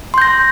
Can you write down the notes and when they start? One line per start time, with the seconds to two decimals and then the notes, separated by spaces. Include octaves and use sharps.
0.14 C6
0.18 G6
0.22 A#6